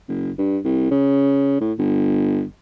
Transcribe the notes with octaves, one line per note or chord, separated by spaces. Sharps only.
F#1
G2
C2
C#3
A2
G1